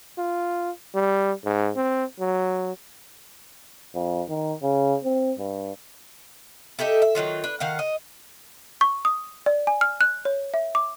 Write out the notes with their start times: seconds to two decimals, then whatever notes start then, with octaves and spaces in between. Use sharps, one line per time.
0.18 F4
0.95 G3
1.45 G#2
1.76 C4
2.19 F#3
3.95 F2
4.29 D#3
4.62 C#3
5.04 C4
5.39 G2
6.79 D#4 G4 A4 E5
7.02 E5
7.15 D#3 E3 F#3 F4
7.44 D4 B4
7.60 D#3 F5 F#5
7.79 D#5
8.81 C#6
9.05 D#6
9.46 D5
9.67 G#5
9.81 F6
10.01 F#6
10.25 C#5
10.54 E5
10.75 D6